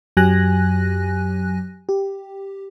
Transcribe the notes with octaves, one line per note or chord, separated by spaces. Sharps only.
F#2 F#3 G4 G#5 F#6 A#6
G4